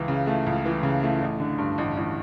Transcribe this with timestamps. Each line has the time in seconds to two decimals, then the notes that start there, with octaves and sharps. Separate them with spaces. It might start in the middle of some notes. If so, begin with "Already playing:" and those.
Already playing: C#2 E3
0.08 C#3
0.27 A3
0.46 C#2
0.65 E3
0.83 C#3
1.03 A3
1.22 A1
1.40 D3
1.58 G2
1.78 A1
1.97 A1